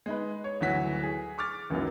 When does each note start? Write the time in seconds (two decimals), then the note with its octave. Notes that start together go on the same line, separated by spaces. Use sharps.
0.06 G#3 D#4 B4
0.44 C#5
0.60 G1 D2 E3 F#3 F#4 B6
1.03 G#4
1.38 C#6 D6 F6 A6
1.70 C#2 F#2 D#3 E3 F#3 A#3